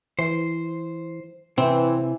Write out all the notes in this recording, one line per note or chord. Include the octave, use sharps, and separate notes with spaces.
E3 C5
C3 E3 C4 E4